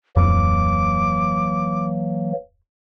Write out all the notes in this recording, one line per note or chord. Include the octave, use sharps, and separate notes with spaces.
D1 G#1 F2 E3 F#3 A#3 D6